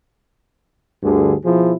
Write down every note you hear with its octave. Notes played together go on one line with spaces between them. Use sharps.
D2 G2 D3 G#4
B2 F3 E4 G#4